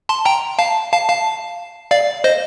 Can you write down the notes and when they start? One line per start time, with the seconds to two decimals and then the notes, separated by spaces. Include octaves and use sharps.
0.09 A5 C6
0.25 G5 A#5
0.59 F5 A5
0.92 F5 A5
1.08 F5 A5
1.91 D5 F5
2.24 C5 D#5